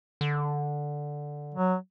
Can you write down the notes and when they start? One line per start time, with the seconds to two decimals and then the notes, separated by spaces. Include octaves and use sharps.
0.21 D3
1.54 F#3